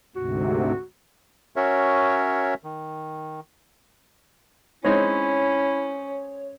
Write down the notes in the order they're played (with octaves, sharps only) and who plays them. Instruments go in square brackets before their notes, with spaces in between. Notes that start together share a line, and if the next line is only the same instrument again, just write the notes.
[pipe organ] D2 G#2 C3 [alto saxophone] F#4
[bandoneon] C#4 F#4 A#4 C#5 E5
D#3
[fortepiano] G#3 C4 D#4 [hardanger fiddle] C#4 [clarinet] E4 [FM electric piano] C#5